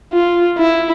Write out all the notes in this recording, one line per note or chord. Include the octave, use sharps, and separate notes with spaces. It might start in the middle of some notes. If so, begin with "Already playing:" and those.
F4
E4